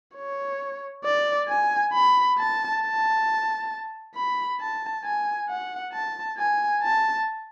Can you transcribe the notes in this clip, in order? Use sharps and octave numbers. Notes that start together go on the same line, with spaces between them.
C#5
D5
G#5
B5
A5
A5
B5
A5
G#5
F#5
A5
G#5
A5